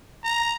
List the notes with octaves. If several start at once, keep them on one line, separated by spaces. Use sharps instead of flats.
A#5